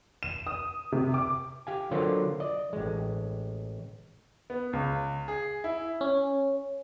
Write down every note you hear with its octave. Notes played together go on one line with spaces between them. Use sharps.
E7
D#6
C3
D6
G4 F5 G#5
D3 F#3 A#3 F4 C5
D5 D#5
A1 G#3
B3
C#2
G#4
E4
C#4